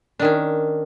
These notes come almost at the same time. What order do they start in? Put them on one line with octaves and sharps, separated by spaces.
D4 D#3 C#4